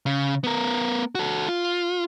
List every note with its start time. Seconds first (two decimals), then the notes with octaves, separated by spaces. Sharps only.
0.06 C#3
0.44 B3 A#4
1.15 F#4 A4
1.49 F4